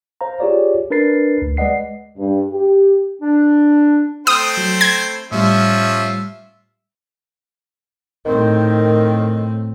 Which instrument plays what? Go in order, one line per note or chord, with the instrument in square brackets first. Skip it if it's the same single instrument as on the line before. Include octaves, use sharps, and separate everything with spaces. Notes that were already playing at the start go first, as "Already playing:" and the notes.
[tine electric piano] C5 F5 A#5
F4 G4 G#4 C#5 D5
D4 A#4 B4 A6 C7
D2
G#3 B4 D5 D#5 F#5 C7
[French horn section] G2
G4
[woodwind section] D4
[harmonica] A3 C4 C5 [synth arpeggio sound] D#6 [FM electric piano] F#6
[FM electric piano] F#3
[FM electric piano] B5 [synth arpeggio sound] G#6
[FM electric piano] A2 G3 [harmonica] F3 C#4 [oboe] E5
[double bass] A2 C4 [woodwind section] D#3